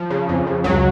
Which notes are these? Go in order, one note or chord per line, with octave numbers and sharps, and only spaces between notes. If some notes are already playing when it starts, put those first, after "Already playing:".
Already playing: F3
C#3
F2
C#3
C#2 F#3